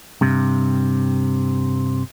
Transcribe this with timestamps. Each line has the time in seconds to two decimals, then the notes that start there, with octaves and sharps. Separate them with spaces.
0.21 G2 C3